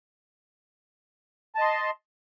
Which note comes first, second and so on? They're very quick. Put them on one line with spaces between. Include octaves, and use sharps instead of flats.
A5 D#5 C6